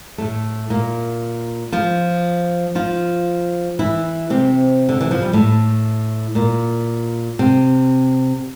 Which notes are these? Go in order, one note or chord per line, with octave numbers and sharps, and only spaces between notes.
A2 A3
A#2 A#3
F3 F4
F3 F4
E3 E4
C3 C4
D3
E3
F3
G3
A2 A3
A#2 A#3
C3 C4